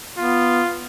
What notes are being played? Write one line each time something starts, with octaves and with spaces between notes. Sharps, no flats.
B3 F4